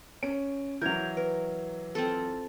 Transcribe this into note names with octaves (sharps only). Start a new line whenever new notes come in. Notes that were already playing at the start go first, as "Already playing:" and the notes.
C#4 D7
E3 F#3 A#4 G6 G#6 F7
A#4 B4
C4 F4 A4